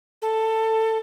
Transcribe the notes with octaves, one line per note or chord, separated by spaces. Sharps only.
A4